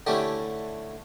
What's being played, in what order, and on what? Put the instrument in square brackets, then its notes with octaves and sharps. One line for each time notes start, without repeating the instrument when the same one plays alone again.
[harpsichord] D3 A3 C#4 E4 G4